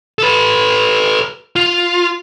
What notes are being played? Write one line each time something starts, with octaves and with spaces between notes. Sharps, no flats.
A4 B4
F4